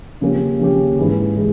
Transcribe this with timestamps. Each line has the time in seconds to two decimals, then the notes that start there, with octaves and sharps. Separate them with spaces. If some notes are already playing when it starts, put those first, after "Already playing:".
0.21 C#3 F3 A#3 C#4 G4
0.59 C#3 F3 A#3 C#4 G4
0.98 G#2 E3 G#3
1.36 E3 G#3